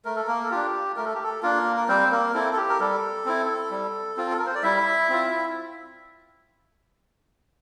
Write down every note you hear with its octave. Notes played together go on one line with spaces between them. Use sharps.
A3 A#4
A4
A#3 A#4
A4
D4 F4 G4
A3 A#4
A4
G4
A4
A#3 D4 F4 A#4
A#4
G3 C4 C5
A#3 A#4
C4 E4 A4
A4
G4
A#4
G3 A4
C4 E4
G3
C4 F4
A4
A#4
C5
D5
G3 E4 E5
C4 F4